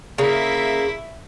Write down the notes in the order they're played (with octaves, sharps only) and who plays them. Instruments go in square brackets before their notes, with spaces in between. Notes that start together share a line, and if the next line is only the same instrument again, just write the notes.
[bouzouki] C#3 [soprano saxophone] A#3 [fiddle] E4 E5